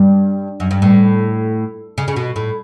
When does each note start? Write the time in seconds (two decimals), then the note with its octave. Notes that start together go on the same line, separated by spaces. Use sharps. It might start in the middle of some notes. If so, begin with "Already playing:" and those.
Already playing: G2
0.60 F#2
0.71 G2
0.82 A2
1.98 C#3
2.08 C#3
2.16 B2
2.36 A2